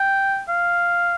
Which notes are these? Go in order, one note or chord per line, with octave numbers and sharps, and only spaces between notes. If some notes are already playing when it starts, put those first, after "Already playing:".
Already playing: G5
F5